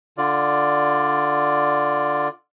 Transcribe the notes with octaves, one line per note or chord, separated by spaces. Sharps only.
D3 F4 D5